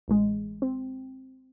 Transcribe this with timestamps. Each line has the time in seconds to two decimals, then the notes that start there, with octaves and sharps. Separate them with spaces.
0.08 A1 G#3
0.62 C4